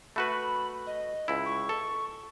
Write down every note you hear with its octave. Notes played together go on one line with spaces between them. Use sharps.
A3 F#4 B4 B5
D#5
C#2 E4
C#6
A4